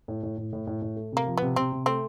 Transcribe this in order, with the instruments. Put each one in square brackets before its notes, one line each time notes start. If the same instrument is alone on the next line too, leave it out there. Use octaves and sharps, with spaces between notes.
[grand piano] A2
A2
A2
A2
A2
A2
A3
[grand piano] C3 [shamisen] A#3
[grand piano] F3
[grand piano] C3 [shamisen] B3
[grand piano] C3 [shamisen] C4
[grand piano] C3
[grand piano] A3 [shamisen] C4